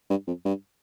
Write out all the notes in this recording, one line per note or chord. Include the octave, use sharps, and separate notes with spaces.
G2
F2
G2